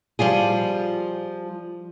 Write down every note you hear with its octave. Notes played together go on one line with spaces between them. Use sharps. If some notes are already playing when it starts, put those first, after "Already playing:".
F3 G3 F4 G#4